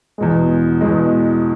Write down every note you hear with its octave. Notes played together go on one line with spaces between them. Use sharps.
E2 B2 G#3
E2 B2 G#3